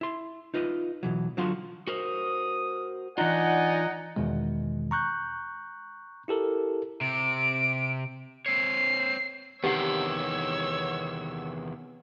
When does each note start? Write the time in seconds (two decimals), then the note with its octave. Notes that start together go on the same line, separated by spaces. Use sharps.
0.01 E4 C6
0.54 D#4 F4 B4 D#5
1.03 B2 E3 F#3
1.37 D3 F#3 F4 F#4 F5 C6
1.87 F#4 A#4 C5 D#6
3.18 E3 D4 D#4 F4 D5 D#5 F#5 G#5
4.16 E2 B2 D#3 G#3
4.91 A#5 C#6 F#6 G6
6.28 E4 G4 A4 A#4
7.01 C3 D7
8.46 C4 C#5 C7
9.64 E2 C3 D#3 B3 G4 C#5 F#5 E6